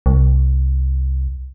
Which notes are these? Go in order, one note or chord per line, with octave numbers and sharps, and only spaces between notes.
C2